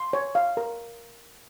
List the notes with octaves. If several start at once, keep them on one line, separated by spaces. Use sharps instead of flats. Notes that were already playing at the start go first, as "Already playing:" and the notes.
Already playing: C6
C#5
F5
A#4